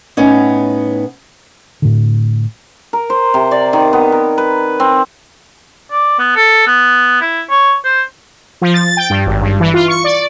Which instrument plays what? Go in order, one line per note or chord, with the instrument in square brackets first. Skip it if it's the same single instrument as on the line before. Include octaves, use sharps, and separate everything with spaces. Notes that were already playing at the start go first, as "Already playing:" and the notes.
[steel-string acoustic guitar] A2 B3 C#4 D#4
[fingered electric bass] A2 D3
[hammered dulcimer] A#4
C5
C3
D5
D#3
B3
A#4
B4
C4
[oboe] D5
B3
A4
B3
E4
C#5
C5
[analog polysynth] F3
A6
G5
G2
G#1
G2
E3
F4
C#6
D5